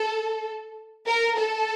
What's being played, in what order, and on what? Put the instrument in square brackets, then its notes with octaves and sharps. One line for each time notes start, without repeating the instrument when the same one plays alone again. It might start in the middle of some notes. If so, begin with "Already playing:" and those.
Already playing: [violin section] A4
A#4
A4